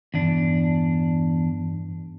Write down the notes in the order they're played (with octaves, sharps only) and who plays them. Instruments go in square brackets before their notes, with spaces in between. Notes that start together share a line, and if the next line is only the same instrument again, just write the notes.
[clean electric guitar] E2 D4 [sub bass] G2